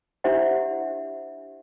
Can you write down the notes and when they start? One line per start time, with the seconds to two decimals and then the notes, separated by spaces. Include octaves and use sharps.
0.24 D4 E4 G4 C5 E5 F#5